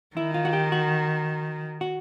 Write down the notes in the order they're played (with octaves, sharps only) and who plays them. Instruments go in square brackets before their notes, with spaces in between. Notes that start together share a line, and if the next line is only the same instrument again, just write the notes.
[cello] D#3 [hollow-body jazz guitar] E4
[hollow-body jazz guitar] F4
F#4
G4
F#4
F#4